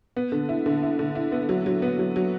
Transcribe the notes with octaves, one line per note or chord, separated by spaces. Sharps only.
B3
D3
E4
D3
E4
D3
E4
B3
F#3
F#3
B3
F#3
F#3